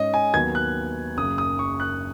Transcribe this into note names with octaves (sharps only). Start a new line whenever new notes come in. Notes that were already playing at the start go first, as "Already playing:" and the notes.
Already playing: G#2 G#3 C#4 D#5
G#5
D#2 D#3 F#3 B3 G#6
F#6
F#1 F#2 C#3 D#6
D#6
C#6
F#6